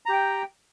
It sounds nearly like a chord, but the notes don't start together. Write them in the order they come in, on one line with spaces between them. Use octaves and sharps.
A#5 G4 G5